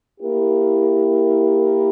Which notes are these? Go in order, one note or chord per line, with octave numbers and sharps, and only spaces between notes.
A#3 E4 G4 A#4